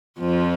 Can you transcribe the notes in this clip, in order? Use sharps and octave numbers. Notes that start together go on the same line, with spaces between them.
F2 F3